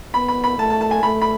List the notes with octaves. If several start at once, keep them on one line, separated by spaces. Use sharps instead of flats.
B3 B5
B5
B5
A3 A5
A5
A5
G#5
A3 B5
B5